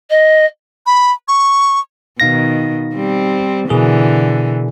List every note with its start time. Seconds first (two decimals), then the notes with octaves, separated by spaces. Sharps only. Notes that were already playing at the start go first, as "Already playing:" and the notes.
0.10 D#5
0.86 B5
1.28 C#6
2.20 B2 D#3 D#4 F5 A#6
2.94 G3 C4
3.69 B2 D3 E3 G#4 A#4